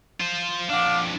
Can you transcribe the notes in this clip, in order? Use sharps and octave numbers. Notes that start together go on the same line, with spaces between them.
F4 C5
F2 D4 F5 F#5 D6